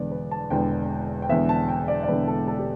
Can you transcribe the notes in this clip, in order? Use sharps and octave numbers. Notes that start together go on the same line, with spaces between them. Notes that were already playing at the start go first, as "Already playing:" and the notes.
Already playing: E1 E2 D3 B3 D5
B4
A5
E1 E2 D3 B3 G5
G5
E1 E2 D3 B3 E5
A5
G5
D5
D5
E1 E2 D3 B3 B4
A4
A4
G4